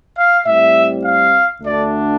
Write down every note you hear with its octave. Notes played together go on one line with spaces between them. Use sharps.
F5
A2 G3 C4 E5
F5
D2 D3 A3 D4 D5